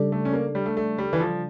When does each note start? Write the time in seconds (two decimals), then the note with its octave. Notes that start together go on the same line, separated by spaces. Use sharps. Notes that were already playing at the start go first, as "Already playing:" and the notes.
Already playing: C#3 G3 D4 A4 D5
0.12 A3
0.25 C#4
0.33 A#3
0.55 G3
0.66 A3
0.77 A3
0.98 G3
1.13 E3
1.20 F3